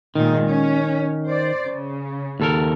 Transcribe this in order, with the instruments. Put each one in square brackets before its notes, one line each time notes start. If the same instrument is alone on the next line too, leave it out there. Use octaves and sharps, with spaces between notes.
[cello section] A#2 G#3 D#4 [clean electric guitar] D#3
[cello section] C#4
C5 D5
C#3
[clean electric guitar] D#2 A4 A#4